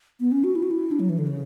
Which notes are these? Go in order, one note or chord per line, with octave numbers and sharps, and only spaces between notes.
B3
C#4
F#4
E4
F#4
E4
D4
F#3
E3
D3
C#3